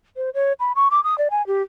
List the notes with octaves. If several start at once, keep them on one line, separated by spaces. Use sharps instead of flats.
C5
C#5
B5
C#6
D6
D#6
D5
G#5
G4